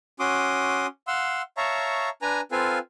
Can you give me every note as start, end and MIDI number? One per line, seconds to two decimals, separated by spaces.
0.20 0.86 61
0.20 0.86 66
0.20 0.86 84
0.20 0.86 86
0.20 0.86 87
1.07 1.42 77
1.07 1.42 78
1.07 1.42 84
1.07 1.42 88
1.57 2.09 73
1.57 2.09 76
1.57 2.09 77
1.57 2.09 81
1.57 2.09 82
1.57 2.09 85
2.22 2.41 62
2.22 2.41 71
2.22 2.41 80
2.22 2.41 82
2.52 2.79 60
2.52 2.79 65
2.52 2.79 69
2.52 2.79 71
2.52 2.79 77
2.52 2.79 80